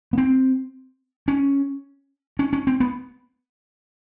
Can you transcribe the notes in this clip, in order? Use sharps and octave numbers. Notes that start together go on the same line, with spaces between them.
B3
C4
C#4
C#4
C#4
C4
B3